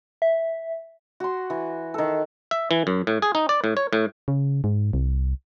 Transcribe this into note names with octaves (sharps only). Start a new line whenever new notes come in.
E5
F#4 C6
E3
D#3 A4
E5
E3
F#2
A2
G#4
D#4
D5
A2
C#5
A2
C#3
G#2
C2